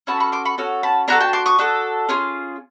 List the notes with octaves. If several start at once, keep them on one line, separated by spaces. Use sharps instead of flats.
C#4 F#4 A4 A5 B5
B5 C#6
C6 D6
B5 C#6
C#4 F#4 A4
A5 B5
D4 F#4 A4 G#5 A#5
G5 A5
C6 D6
C#6 D#6
D4 F#4 A4
C#4 F4 G#4